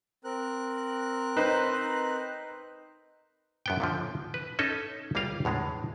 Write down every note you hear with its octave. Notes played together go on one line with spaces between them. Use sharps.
C4 A#4 F#6
D#4 B4 C5
F#2 B3 G5
A#2 D3 F3
B4
C#4 D#4 A4 D#5
C#2 G3 A#3 F4 F5 G5
E2 A2 G#3 D4